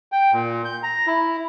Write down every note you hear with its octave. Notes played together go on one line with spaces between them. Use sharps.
G5
A#2
G6
A#5
E4